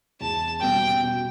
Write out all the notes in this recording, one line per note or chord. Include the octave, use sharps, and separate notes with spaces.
E2 A5
B2 G3 B3 G5
B2